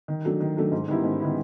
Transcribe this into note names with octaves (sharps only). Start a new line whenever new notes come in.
D#3
F#3 A3 D4
D#3
F#3 A3 D4
G#2
D#3 G3 B3 E4
G#2
D#3 G3 B3 E4